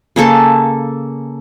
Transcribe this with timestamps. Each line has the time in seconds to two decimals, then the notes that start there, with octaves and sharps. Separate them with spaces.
0.16 C#3 A#3 A4 A5